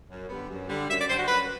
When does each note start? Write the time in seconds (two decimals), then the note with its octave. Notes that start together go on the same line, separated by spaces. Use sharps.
0.09 F#2
0.29 D3 G3 B3
0.49 F#2
0.68 D3 G3
0.88 F#2 E5
0.98 D5
1.08 G3 C5
1.11 D3
1.17 F#4
1.28 F#2 B4